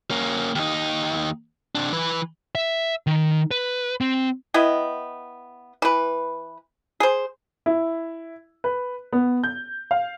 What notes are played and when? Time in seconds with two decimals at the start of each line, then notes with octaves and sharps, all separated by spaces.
0.11 A#3 C#4
0.55 D#2 D#4
1.75 C3 D4
1.92 E3 B4
2.55 E5
3.07 D#3
3.51 B4
4.01 C4
4.54 B3 E4 D#5 G5
5.82 E3 B4
7.00 G#4 C5
7.66 E4
8.64 B4
9.13 B3
9.44 G6
9.91 F5